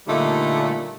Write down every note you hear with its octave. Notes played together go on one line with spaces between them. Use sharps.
A#2 D3 G3 A3 D#4 F4